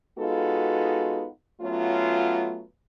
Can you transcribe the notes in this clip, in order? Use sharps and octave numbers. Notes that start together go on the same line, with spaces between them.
G#3 B3 D#4 F4 F#4 A4
F#3 A3 B3 C#4 F4